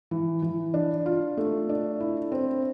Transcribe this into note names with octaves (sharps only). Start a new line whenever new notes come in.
E3
E3
D4
F4
A3
D4
E4
C4